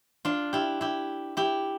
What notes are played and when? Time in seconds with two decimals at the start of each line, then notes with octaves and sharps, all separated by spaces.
0.25 D4 F4
0.53 E4 G4
0.81 E4 G4
1.37 E4 G4